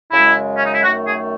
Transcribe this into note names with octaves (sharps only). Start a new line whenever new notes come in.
F#2 C#3 G#3 E4
C#4
D#4
E4
F#2 D#3 A3 F#4
G#4